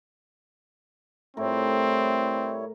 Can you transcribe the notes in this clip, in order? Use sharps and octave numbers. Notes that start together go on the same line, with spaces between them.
A2 G3 C4 E4 A#4 C#5